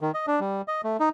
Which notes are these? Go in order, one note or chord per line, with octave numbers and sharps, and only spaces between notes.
D#3
D#5
D4
G3
D#5
A3
D#4